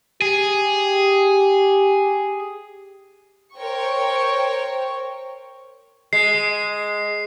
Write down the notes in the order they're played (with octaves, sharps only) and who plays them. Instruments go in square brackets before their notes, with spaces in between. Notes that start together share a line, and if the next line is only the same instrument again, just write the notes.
[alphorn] G4 [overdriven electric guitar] G#4
[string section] A#4 C5 C#5 G5 C#6
[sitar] G#3 [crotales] C7